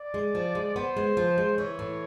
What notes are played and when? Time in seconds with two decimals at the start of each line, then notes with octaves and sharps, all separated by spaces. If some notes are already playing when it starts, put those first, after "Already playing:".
Already playing: D5
0.14 G#3
0.35 F3
0.55 G#3
0.75 B3 C5
0.97 G#3
1.17 F3
1.38 G#3
1.58 E3 C#5
1.79 A2